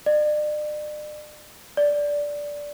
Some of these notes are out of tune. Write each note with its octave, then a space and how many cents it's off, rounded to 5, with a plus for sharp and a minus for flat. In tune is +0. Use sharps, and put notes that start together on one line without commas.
D5 +40
D5 -10